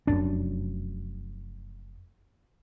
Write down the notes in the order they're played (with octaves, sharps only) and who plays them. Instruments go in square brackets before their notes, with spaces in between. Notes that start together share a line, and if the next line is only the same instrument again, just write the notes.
[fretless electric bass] F1 F#2 D4